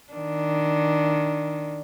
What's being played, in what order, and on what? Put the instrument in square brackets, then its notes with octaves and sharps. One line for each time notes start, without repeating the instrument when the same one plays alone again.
[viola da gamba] D#3 D4